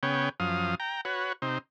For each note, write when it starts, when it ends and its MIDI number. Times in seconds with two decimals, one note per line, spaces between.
0.03 0.29 49
0.03 0.29 59
0.03 0.29 73
0.03 0.29 79
0.40 0.75 42
0.40 0.75 53
0.40 0.75 77
0.40 0.75 87
0.80 1.01 79
0.80 1.01 82
1.05 1.33 66
1.05 1.33 71
1.05 1.33 73
1.42 1.58 48
1.42 1.58 63
1.42 1.58 72